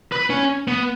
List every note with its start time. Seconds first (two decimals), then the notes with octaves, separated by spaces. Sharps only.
0.12 B4
0.30 C#4
0.68 B3